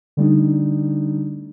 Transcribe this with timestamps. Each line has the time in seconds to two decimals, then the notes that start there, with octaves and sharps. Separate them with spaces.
0.17 D3 G3 A3 D4 D#4